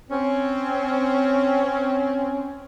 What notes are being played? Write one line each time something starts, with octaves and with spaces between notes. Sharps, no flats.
C4 C#4